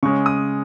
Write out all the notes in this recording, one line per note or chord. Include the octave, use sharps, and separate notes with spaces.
C#3 G#3 C#4 C#6
D#6